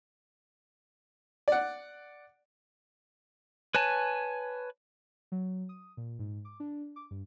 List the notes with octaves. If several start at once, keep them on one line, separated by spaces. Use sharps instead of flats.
D5 F#5
B4 C#5 G#5 A5
F#3
D#6
A#2
G#2
D6
D4
D6
G2